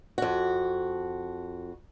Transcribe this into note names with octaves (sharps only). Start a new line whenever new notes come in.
F2 F#4